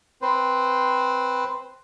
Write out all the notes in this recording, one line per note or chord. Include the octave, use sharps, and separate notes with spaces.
C4 B4 C5